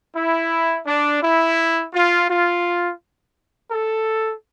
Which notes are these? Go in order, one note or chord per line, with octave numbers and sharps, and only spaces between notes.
E4
D4
E4
F4
F4
A4